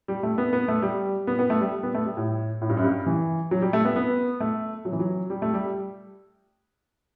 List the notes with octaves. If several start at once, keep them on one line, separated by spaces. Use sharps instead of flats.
G3
A3
B3
B3
A3
G3
B3
B3
A3
G3
B3
A3
G3
A2
A2
G2
F#2
G2
E3
F#3
G3
A3
B3
B3
A3
F#3
E3
F#3
G3
A3
G3